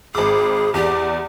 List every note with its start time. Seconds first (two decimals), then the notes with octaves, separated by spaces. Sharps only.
0.15 G#1 G#4 D6
0.74 E2 G4 D5